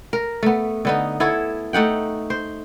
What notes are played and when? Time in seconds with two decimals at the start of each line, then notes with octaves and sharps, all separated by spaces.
0.13 A#4
0.43 A3 B3
0.85 D3 B3 D#4
1.20 B3 E4 A4 C#5
1.73 A3 D#4 F#5 G5
2.30 C5